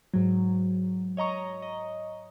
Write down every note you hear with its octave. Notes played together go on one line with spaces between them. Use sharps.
G#2 F#3
C#5 D#5 A#5 C#6
D#5